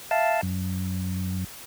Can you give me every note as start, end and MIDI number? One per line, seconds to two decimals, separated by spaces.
0.11 0.41 76
0.11 0.41 77
0.11 0.41 81
0.43 1.44 42